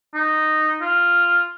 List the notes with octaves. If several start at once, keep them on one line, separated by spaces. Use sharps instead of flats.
D#4
F4